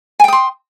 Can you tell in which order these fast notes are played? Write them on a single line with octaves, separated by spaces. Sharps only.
G#5 G5 D#6 C6